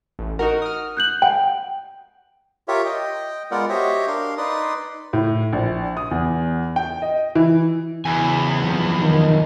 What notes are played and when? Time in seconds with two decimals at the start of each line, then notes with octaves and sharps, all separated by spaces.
0.19 A1
0.39 D#4 F#4 A#4 F#5
0.62 D#6 F6
0.97 F#6 G6 F#7
1.22 F#5 G5
2.68 F4 G4 A#4 C#5 E5
2.85 D#5 G5
3.51 G#3 B3 F4 A#4 D5 F#5
3.69 F#4 G4 C5 C#5 D#5 E5
4.07 D4 A#4 F5 C6
4.38 D#4 B4 D5 C6 D#6
5.13 A2
5.53 A#1
5.97 D#6
6.11 E2
6.76 G5
7.02 D#5
7.35 E3
8.05 E2 C#3 E4 G#5
8.62 F#2 C3 F3
9.02 D#3